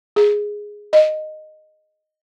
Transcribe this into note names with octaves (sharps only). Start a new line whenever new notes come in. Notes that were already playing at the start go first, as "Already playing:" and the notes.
G#4
D#5